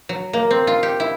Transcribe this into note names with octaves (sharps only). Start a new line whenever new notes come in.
F#3
A#3
C4
F4
G4
E4